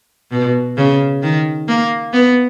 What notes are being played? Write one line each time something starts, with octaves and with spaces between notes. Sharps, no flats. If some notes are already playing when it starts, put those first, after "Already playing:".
B2
C#3
D#3
A#3
B3